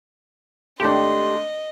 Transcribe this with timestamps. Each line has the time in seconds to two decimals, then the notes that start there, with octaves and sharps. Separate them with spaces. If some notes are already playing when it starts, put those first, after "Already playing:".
0.80 G#1 A3 D4 G4 D#5 C6